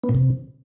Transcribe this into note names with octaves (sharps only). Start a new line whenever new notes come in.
B3
A#2
C3